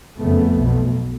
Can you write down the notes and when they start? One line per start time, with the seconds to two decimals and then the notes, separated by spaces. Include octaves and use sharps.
0.19 F#1 F2 C#3 A3 B3
0.55 B1 B2